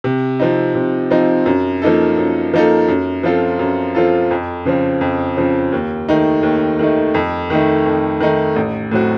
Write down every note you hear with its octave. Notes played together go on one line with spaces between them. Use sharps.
C3
F3 C4 D#4
C3
F3 C4 D#4
F#2
F3 A#3 D#4 A4
F#2
F3 A#3 D#4 A4
F#2
F3 C4 F4 A4
F#2
F3 C4 F4 A4
F2
C#3 F3 C4
F2
C#3 F3 C4
D#2
D#3 A3 D#4
D#2
D#3 A3 D#4
F2
D#3 A3 D#4
F2
D#3 A3 D#4
A1
A2 F#3 C4 F#4